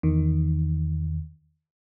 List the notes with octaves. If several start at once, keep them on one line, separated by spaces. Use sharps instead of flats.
E2 D#3